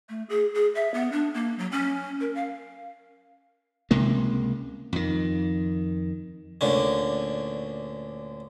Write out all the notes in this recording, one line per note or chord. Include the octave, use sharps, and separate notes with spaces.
A3
G#4
G#4
E5
B3
D4
A#3
F#3
C#4
A#4
F5
C#2 C3 G#3 A#3
F2 D#3
D2 A#2 D3 C#4